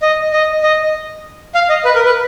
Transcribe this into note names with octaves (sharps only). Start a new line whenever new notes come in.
D#5
D#5
D#5
F5
D#5
B4
A#4
B4